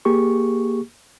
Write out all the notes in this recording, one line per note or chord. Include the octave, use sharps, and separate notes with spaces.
A#3 G4 G#4 C#6